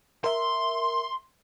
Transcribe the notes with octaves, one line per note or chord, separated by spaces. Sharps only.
A#4 E5 C6